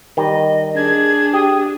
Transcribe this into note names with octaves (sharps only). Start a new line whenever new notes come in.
D#3 G3 D#5
D4 G#4 G#6
G4 D#6